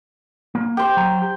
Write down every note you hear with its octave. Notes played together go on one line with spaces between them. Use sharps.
A#3
G4 C5 G5
F#3 A#5
G4